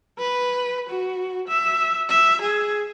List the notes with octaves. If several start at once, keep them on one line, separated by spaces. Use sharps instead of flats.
B4
F#4
E5
E5
G#4